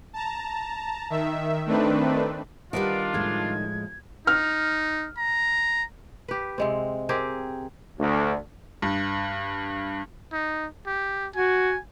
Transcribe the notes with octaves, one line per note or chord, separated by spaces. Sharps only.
A5 A#5
D#3 E5
D#3 A3 C4 D4 B4
D#3 G3 D4 F4 B4 D5 F#5 D7
A2 F3 G#3 G#6
D#4 F6
A#5
G4 B4
C3 G#3 C4
C4 G4 G#4 A#4
D2
G2
D#4
G4
F#4 G#5